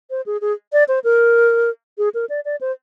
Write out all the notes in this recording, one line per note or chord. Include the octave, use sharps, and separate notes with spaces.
C5
G#4
G#4
D5
C5
A#4
G#4
A#4
D5
D5
C5